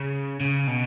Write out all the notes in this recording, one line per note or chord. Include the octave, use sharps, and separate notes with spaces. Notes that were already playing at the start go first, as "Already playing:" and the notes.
Already playing: C#3
C#3
B2